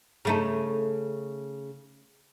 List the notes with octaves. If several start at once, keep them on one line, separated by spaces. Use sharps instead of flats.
C#3 A3 D#4